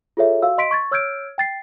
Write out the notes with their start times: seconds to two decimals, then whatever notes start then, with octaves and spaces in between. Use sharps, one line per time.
0.17 F4 G#4 A4 C#5 E5
0.42 F#4 F5 E6
0.58 D#5 C6 B6 D7
0.71 C#6 G#6 A6
0.91 C#5 E6 F6 G6 G#6 D7
1.38 G5 A6 C7